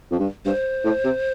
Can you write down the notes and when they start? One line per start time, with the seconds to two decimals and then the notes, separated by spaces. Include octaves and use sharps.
0.12 F2
0.19 G2
0.46 G2 C5
0.84 A2
1.04 C3